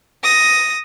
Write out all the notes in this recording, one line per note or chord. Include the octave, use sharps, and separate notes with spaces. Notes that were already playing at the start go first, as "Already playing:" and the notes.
D#6 A#6